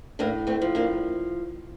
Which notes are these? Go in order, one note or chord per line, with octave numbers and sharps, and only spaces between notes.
A2 A#3 D4
A3 C4
F3
A#3 D4